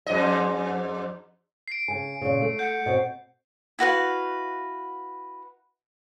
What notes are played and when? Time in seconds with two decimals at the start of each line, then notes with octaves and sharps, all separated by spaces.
0.06 F2 G#2 D#5
1.68 C7 D7
1.88 C#3 G#5
2.21 A#2 C#3
2.41 A3
2.59 F#5 G6
2.86 B2 C4
3.79 E4 F#4 B4 F5